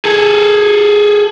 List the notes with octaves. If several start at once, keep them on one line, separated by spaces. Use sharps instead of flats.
G#4 A4